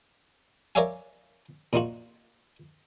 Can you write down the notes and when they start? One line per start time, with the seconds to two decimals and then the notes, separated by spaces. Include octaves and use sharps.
0.75 A#4 C#5 D5 E5 F5 G#5
1.73 A#2 D#4 F4 F#4